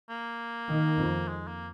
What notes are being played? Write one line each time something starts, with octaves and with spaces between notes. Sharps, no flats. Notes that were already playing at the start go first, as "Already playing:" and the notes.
A#3
D#3
F2
G#3
A#3